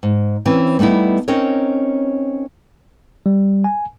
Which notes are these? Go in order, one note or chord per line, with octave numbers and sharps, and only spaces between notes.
G#2
E3 C4 C#4
G3 A3 B3 D#4 E4
C4 C#4 D#4 A#4 C#5
G3
G#5